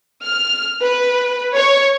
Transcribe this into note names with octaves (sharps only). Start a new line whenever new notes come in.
F6
B4
C#5